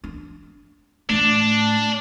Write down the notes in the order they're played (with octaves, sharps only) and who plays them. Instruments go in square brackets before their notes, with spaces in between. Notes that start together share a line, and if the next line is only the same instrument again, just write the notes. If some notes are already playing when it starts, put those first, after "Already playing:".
[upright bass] D4
[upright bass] A2 A3 [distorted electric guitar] D4